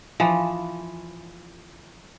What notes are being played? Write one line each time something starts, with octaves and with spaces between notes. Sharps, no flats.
E3 F3